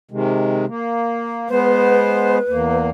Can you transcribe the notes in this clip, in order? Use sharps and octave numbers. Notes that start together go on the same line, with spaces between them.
C3 D#3 G#3
A#3
G#3 B3 B4 C5
E2 A#3